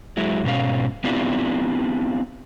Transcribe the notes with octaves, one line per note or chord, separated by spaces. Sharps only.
F#3 G#3 E4
G#2 B2 C#4 F5
B3 C4 D4 E4 F4 G4